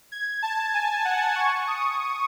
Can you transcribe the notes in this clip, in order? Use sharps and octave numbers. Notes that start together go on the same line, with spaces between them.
G#6
A5
G#5
F#5
C#6
D#6